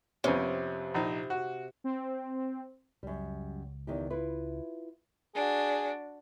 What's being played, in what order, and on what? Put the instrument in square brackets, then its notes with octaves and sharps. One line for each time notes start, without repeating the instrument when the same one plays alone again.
[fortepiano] F2 B3 C#4 [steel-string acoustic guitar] C3
[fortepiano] A#1 D#4
F#4
[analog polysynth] C4
[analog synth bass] C#2 [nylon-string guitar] F#2 G3
[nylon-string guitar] E2 D#3 G4
E4 F4 B4
[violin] D4 F#4 [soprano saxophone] G#4